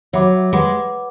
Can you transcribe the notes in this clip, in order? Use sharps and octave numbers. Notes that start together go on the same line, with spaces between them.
F#3 C#5 E5 B5 D6
G#3 B4 F#5 B5 D6